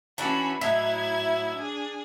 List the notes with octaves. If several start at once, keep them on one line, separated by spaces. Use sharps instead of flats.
E3 C#4 D4 E4 F#4 B5
A2 F#3 D#4 E4 E5 G#6
D4 G#4